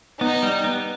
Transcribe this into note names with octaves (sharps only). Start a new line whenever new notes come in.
B3 D#4
G3
B3